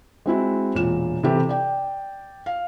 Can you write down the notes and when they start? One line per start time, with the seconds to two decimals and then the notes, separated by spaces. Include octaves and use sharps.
0.26 G#3 C4 E4 F#4
0.74 E1 A#2 E7
1.23 C3 E3 E4 G4 A4
1.49 D5 G5
2.46 F5